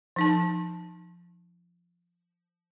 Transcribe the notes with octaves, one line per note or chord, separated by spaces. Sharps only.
F3 D#4 A5